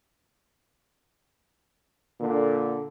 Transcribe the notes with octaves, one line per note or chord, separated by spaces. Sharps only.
A#2 D3